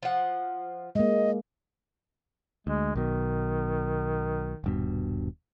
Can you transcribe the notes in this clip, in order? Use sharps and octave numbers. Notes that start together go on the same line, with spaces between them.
F3 F#5
G#3 A#3 D#5
D2 G#3
B1 B2 D#3
D#1 G2 B2